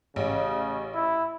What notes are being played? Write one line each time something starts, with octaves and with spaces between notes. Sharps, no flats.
A1 C#3
E4